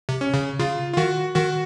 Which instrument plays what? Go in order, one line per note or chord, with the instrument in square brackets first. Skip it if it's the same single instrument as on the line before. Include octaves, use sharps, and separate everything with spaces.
[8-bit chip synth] C3
[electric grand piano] C#4
[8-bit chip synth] C#3
[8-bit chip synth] C#3 [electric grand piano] F4
[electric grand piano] F4
[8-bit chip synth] D#3 [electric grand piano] F#4
[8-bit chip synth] D#3 [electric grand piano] F#4